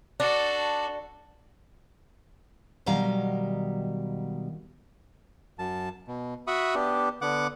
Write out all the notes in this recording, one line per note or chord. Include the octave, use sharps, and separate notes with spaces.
D4 F#4 A4
B2 D#3 F#3 G3 F5 A#5
F#2 A5
B2
F#4 E5 B5 C#6 D#6
B3 D4 G4
D3 B3 F#5 D6